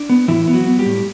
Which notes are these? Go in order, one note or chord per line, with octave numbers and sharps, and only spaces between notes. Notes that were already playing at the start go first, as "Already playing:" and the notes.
Already playing: D4
B3
A2 E3 E4
B3
F#3 F#4
B3
G3 G4
A2